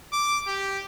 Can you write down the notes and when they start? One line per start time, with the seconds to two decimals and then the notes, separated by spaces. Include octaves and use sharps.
0.13 D6
0.47 G4